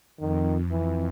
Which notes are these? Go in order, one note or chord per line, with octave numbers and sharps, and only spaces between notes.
F2 D#3
E3